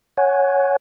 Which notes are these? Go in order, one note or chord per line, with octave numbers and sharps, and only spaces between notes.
C#5 F#5 G#5